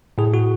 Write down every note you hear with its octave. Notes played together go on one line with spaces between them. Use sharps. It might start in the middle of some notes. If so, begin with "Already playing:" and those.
A2 G#4
F#4